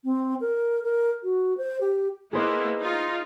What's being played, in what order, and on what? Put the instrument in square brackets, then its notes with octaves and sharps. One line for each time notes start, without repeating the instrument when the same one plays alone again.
[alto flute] C4
A#4
A#4
F#4
C5
G4
[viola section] A#3 B3 E4 [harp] G#4 C5 D#5
[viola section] D#4 F4